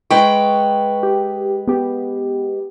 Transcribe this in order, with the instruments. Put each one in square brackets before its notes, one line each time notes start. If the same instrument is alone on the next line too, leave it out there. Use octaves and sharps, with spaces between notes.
[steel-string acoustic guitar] G#3 B4 G5 [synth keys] C#6
[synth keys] G4
B3 G4